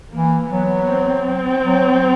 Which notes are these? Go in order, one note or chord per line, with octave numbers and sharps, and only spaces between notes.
E3 A#3
F#3 B3
C4
F#3